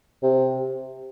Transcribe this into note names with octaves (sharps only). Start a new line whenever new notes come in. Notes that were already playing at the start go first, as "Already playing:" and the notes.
C3